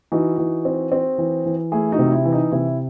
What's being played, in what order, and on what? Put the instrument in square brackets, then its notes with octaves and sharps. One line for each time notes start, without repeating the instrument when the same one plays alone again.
[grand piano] E3 D#4 F#4
E3
C4
C4
E3
E3
A3 E4 G#4
D#4 F#4
C3
E4
E3
D#4
C3 E4